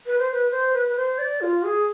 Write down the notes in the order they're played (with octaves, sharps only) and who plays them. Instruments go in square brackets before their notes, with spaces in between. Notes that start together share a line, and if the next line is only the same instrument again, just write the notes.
[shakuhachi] B4
C5
B4
C5
B4
B4
C5
D5
F4
G#4